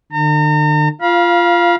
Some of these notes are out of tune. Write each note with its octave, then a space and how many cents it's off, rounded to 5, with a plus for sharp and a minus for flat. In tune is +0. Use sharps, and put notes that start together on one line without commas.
D3 +45 A#5 -40
F4 -15 F5 +0 B5 -40